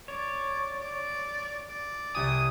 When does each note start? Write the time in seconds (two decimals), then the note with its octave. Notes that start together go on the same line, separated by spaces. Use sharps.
0.08 C#5 D5
0.81 D5
1.69 D5
2.14 C2 G#5 D#6